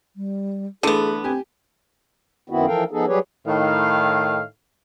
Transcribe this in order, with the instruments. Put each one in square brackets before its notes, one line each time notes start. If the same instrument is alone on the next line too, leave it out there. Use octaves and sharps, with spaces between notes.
[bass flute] G3
[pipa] D3 B3 [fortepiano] E3 A3 [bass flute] G#4
[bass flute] C4 [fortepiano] G4 G#5
[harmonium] F#2 D#3 B3 C4 E4 F#4
E3 F3 A4 A#4 F5 G5
F3 B3 D#4 G#4 A4
F#3 G3 G4 G#4 B4 C#5
[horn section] A2 D#3 F5